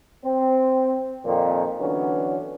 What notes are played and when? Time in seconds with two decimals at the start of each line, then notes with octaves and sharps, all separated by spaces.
0.24 C4
1.25 F2 A#2 D#3
1.80 D3 E3 F#3 B3 C#4 D4